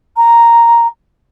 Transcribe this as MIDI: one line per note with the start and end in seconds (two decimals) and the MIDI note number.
0.16 0.86 82